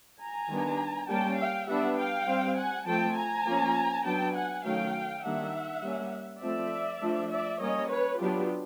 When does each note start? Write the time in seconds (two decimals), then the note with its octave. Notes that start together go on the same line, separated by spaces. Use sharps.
0.19 G#5 A#5
0.49 D#3 G3 B3 D4
1.08 G3 A#3 C#4 G5 A5
1.38 F5 G5
1.67 G3 B3 D4 E5 F#5
1.97 F5 G5
2.27 G3 C4
2.56 F#5 G#5
2.86 F3 A3 C4 G5 A5
3.16 G#5 A#5
3.45 F3 A#3 C#4
4.05 F#3 B3 D4 G5 A5
4.35 F#5 G#5
4.64 D#3 F#3 A3 C#4 F5 G5
5.23 D#3 G3 A#3 D4 E5 F#5
5.82 G3 A#3 C#4
6.41 F3 A3 C4 D5 E5
7.01 F3 A3 D4
7.30 D5 E5
7.60 G3 A#3 C#4 C#5 D#5
7.89 B4 C#5
8.19 F#3 B3 D4 F4 G4